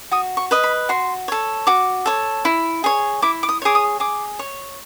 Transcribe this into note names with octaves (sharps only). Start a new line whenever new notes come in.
F#4 D#6
C#6
B4 D#5
B5
F#4 C6
A4 C#5
F#4 D6
A4 C#5
E4
G#4 C#5
E4 D6
D6
D#6
G#4 C#5 D6
D#6
G#4 D6
C#5